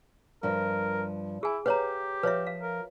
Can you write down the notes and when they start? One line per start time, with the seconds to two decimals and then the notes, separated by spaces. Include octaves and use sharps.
0.43 G2 F3 A#4
1.43 E4 G#4 G#5
1.66 G4 B4 C#5 F5 A#5
2.23 F3 B4 C#5 E5
2.47 F5
2.62 A#4